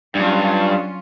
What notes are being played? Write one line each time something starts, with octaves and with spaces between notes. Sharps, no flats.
G2 F#3 C#4 F4